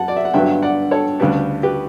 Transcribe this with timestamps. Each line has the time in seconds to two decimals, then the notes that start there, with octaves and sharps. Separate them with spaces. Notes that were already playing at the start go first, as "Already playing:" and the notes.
Already playing: F#2 F#5 A5
0.08 D5
0.17 E5
0.25 F#5
0.34 G2 D3 F#3 B3 E5 G5
0.62 D5 F#5
0.91 A4 C#5
1.20 D2 C#3 G3 D4 G4 B4
1.63 G4 B4